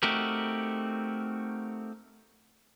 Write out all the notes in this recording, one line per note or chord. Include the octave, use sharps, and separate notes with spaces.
A3 C4 D#4 F#4 G4 A#4